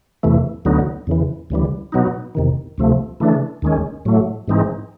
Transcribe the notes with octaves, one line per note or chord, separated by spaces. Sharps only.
E2 C3 E3 A3
D2 D3 F#3 B3 D#4
E2 C#3 E3
D2 C#3 E3 G3
B2 F#3 B3 D#4
E2 C3 D#3
D2 C3 F3 A3
C#3 E3 A3 D4
D#2 D#3 G#3 C#4
A2 F#3 A3
G#2 E3 G#3 C4 D#4